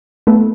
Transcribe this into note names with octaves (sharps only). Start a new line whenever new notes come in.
A3 B3